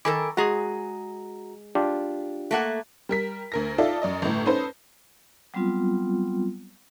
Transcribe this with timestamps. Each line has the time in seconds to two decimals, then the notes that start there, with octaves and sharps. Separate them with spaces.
0.05 D#3 A4 A#4 G#5 B5 D6
0.37 G#3 F#4 G#4 A#5
1.75 D4 F4 G4
2.51 A3 A#3 F#5
3.09 G3 A#4 B6
3.52 D2 A#4 A#6
3.78 D#4 F4 A4 D5 E5
4.02 F#2 D5 D#5
4.22 G1 A2
4.46 C#4 D#4 A4 B4 C5
5.54 F#3 G3 B3 C4 F4